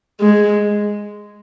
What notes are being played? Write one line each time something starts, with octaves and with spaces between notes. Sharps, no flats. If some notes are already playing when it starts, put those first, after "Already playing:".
G#3